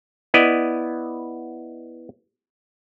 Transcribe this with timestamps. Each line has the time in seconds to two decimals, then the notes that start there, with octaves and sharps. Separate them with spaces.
0.34 B3 E4 D5 D#5